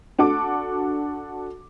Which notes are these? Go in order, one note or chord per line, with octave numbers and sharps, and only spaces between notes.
D4 F#4 A4 D6